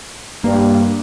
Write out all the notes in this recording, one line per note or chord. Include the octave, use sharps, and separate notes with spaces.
G2 A#3